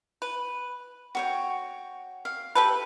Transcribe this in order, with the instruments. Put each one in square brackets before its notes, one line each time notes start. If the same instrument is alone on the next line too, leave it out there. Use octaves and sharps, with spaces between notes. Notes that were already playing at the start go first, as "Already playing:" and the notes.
[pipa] B4
[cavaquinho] F#4 C#5 G5
F5
[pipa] G4 A4 B4